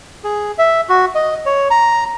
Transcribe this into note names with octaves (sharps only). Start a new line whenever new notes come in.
G#4
E5
F#4
D#5
C#5
A#5